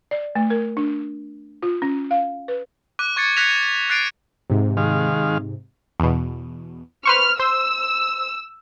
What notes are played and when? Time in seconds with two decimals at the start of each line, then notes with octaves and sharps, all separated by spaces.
0.11 D5
0.35 A3
0.50 A#4
0.77 D4
1.62 F4
1.82 C#4
2.11 F5
2.48 B4
2.99 D6 F#6 D#7
3.17 C#6 G#6 A6 C#7
3.37 F#6 G#6 A#6 B6 C#7 F7
3.90 F#6 A6 C7 D7 D#7
4.50 G#2 C3
4.77 D#3 G#3 F5
6.00 E2 B2
7.05 B4 C5 C#6 F6
7.40 C5 E6